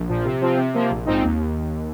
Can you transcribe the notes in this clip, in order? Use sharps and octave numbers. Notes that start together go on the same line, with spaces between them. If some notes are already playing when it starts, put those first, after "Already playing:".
Already playing: A#1
A#2 F3
C3
F3 C4 F4
C3
F3 A#3
A#1
G#2 F3 C4 D#4
D#2